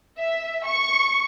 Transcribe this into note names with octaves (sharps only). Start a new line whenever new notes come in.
E5
C#6